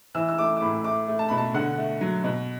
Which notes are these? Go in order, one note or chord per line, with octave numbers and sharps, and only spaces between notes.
E3 E6
E6
A3 D6
D6
A2 B5
A3 D6
A3
A5
B2 B5
A5
D3 F#5
A3
F#3
B2